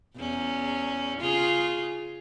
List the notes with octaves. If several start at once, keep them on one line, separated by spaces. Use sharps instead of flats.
E2 C#4
C#3 F4 G#4